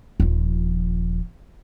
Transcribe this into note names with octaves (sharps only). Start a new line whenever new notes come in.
D#1 F3